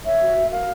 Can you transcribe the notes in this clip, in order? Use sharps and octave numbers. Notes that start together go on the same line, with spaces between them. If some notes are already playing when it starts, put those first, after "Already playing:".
C#5 E5
F#4
F#4
A#4 F5